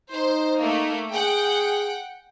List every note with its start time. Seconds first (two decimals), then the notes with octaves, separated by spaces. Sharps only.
0.12 D#4 C5
0.62 A3 A#3
1.13 G#4 F#5 G5